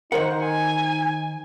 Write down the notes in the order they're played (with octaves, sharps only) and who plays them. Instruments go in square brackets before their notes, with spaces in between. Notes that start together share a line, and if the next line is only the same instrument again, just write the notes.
[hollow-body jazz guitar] D#3 F#5 [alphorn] D#4 [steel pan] A#4 C5
[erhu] G#5